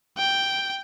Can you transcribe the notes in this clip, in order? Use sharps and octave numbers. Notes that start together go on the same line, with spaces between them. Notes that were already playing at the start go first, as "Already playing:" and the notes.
G5